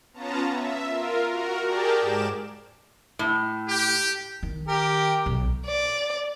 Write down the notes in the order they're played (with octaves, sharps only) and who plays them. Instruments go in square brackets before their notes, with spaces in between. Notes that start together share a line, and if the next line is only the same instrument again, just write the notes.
[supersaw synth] B3 C#4 F4 A5 A#5
E5
F4 A#4
F#4 A#4
G4 G#4 A#4 D5 G5 A5
G#2 D6 E7
[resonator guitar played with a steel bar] A2
[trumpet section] G4
[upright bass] D#3
[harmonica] G4 A#4
[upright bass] B1
[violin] D5